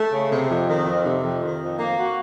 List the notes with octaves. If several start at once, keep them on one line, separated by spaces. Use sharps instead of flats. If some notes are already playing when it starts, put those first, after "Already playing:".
Already playing: A3
C#3
C3
F2
D#3
F2
C3
F2
D#3
F2
A#3
F#4